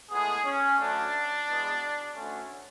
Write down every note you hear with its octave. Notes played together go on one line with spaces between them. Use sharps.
A2 G#3 B3 G#4
C#4
D2 D3 F#3 A3 D4
E2 B2 G#3 B3
D2 D3 A3 C#4